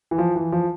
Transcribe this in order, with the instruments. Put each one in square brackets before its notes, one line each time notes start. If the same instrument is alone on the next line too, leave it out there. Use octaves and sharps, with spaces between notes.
[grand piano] E3
F3
E3
F3